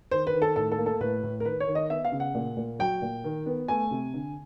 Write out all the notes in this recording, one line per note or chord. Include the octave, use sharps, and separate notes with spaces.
D#3 C5
B4
D#3
A4
A2 A4
A4
A#3
A4
A2 B4
A2
A#4
D#3 B4
C#5
D#3
D#5
B3 E5
F5
C#3
F#5
A#2
A#2
F#3 G5
A#2
D#3
B3
A3 G#5
C3
D3